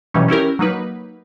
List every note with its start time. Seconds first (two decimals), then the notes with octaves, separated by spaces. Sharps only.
0.14 B2 E3 F#3 G3 C#4
0.28 C#4 E4 G4 A#4
0.59 F#3 A#3 D#4 B4